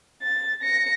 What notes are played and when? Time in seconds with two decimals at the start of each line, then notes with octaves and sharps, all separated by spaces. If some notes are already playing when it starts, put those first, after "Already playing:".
0.23 A6
0.63 A#6 C#7